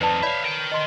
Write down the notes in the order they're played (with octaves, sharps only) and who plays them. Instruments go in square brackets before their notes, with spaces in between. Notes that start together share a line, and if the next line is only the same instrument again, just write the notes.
[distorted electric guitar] F2 D#3 [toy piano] B4 D5 A5
[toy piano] C#5 D5 B5 [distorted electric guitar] E5 F5
[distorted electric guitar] A#4 G5
[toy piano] D#5 C6